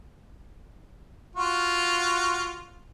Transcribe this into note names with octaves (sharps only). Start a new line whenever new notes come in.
F4 F#4